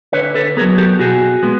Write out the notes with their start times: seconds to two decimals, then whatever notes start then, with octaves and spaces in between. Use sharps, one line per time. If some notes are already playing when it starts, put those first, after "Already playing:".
0.13 D3 B4 C#5
0.34 A4 B4
0.57 B3 G#4 A#4
0.61 F#3
0.78 G4 A4
0.99 B2 F#4 G#4
1.43 G#3 B3